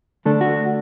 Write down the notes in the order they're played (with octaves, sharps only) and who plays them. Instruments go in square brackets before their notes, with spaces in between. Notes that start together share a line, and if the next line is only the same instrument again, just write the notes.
[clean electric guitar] D3 A3 D4 A4
F#4